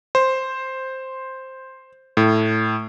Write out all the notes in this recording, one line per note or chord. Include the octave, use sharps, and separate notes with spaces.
C5
A2